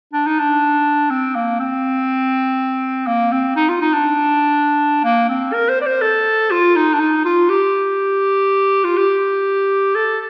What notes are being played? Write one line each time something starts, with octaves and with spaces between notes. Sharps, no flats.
D4
D#4
D4
C4
A#3
C4
A#3
C4
D#4
F4
D#4
D4
A#3
C4
A#4
C5
D5
C5
A4
F4
D#4
D4
D#4
F4
G4
F4
G4
A4